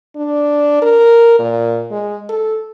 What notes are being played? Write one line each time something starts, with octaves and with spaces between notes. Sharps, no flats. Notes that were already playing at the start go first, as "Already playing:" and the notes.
D4
A#4
A#2
G#3
A4